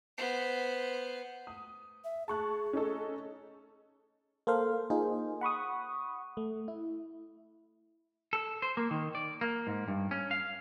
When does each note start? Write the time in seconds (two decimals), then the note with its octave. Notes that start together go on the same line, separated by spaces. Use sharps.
0.18 B3 C5
1.47 D#6
2.04 E5
2.28 G#4 A5 C#6 F#6
2.73 C#4 D#4 A4
4.47 A#3 A4 C5 F5
4.90 A#3 D#4 F4 G#4 C5
5.41 F#5 B5 C#6 D#6
6.37 A3
6.68 E4
8.33 A4
8.62 C5
8.77 A#3
8.91 D#3
9.15 D5
9.41 A#3
9.67 G#2
9.88 G2
10.11 C#4
10.31 F5